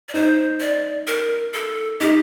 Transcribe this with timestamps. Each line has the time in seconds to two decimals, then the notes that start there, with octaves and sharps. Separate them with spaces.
0.09 D5
0.14 D#4 C5
0.60 D5
1.07 A#4
1.54 A4
2.00 D#4 G4